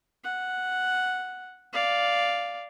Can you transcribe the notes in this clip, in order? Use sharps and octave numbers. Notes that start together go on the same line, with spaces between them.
F#5
D5 F5